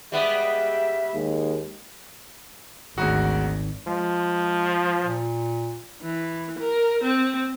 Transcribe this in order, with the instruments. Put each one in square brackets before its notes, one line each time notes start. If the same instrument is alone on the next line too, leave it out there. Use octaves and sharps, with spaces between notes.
[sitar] G3 B3 G4 [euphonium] G#3 [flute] E5
[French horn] D#2 [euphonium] G#3
[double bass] G#1 [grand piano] D2 G#2 F#4
[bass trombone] F3 [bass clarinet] G#3
[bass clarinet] A#2
[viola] E3
A#4
C4